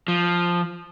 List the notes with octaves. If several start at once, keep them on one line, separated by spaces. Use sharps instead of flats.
F3